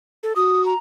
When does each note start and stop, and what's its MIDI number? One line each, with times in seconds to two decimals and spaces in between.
0.23 0.33 69
0.36 0.73 66
0.36 0.64 87
0.66 0.78 82